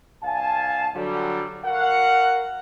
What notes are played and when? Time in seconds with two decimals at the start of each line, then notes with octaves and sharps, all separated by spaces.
0.23 C2 F5 G#5 A5
0.95 D3 F#3 G3
1.64 F#4 A#4 F5 F#5